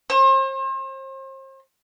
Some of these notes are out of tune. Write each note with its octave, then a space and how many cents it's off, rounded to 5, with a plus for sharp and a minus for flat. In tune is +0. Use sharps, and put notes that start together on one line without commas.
C5 +40